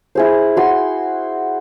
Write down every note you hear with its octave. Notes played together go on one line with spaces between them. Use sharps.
E4 G#4 C5
F#4 C6